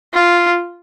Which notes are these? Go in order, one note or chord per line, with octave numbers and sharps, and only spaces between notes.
F4